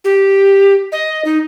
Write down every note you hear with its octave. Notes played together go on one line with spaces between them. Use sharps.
G4
D#5
D#4